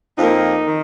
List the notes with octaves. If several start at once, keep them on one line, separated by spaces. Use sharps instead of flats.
F2 F3 A#3 D#4
D#3